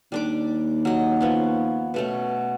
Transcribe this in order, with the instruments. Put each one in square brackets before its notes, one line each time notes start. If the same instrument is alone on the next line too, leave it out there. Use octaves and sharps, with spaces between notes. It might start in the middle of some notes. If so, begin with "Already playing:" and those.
[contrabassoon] D#2 [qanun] G3 D4 D6
[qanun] F#3 D#5
F3 B3 C#4
B2 A3 C#4